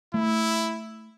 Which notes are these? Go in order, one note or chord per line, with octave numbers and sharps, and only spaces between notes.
A3 E4